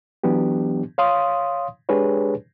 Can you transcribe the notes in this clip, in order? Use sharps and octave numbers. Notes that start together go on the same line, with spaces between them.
E3 F#3 B3 D4 G4
C#5 F5 C6 D#6
G#3 D4 G4 G#4 B4 C#5